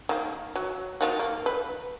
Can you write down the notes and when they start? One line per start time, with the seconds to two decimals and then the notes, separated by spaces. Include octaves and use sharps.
0.09 D#3 A#3
0.56 F#3
1.01 D#3 F4 F#4
1.19 A#3
1.46 B4